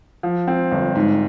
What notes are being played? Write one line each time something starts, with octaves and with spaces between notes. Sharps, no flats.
F3
C4
G1
G#2